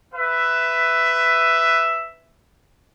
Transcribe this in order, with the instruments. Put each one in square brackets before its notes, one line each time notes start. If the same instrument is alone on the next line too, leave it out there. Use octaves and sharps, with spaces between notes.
[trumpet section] B4 E5